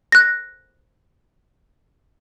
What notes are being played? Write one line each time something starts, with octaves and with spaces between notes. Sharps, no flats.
F#6 A#6